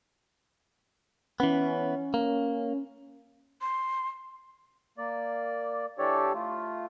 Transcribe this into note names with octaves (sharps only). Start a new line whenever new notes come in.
E3 B3 C#4
A#3
C6
A#3 D5
E3 D4 G4 A4 C#5 D5
A3 F4